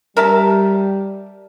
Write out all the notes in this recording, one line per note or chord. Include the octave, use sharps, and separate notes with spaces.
G3 A#4 E5 A5